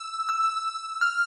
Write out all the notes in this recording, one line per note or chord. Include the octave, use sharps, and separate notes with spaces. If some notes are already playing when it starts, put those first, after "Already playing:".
Already playing: E6
E6
F6